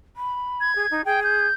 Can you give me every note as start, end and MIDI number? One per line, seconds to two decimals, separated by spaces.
0.16 0.74 83
0.60 1.04 92
0.75 0.86 68
0.91 1.02 63
1.05 1.47 68
1.05 1.20 79
1.24 1.54 91